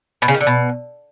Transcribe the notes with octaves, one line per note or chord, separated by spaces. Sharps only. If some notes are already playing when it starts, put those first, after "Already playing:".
B2
C#3
D#3
D3
B2